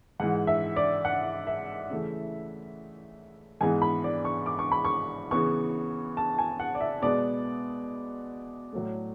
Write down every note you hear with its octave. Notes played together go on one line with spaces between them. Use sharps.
G#2 E3 G#3 F#5
E5
D5
F#5
E5
C#3 E3 A3
G#2 E3 G#3 B3 G#5
B5
D5
C#6
D6
C#6
B5
C#6
C#3 E3 B3 C#6
A5
G#5
F#5
D5
E5
B2 G#3 B3 D5
A2 F#3 A3